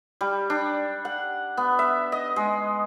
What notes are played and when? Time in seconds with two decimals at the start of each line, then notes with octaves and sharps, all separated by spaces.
0.21 G3
0.50 D4
1.05 F#5
1.57 B3
1.79 E5
2.12 D#5
2.36 G#3